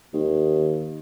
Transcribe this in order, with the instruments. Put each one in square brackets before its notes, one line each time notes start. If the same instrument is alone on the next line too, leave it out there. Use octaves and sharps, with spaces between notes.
[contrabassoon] D#2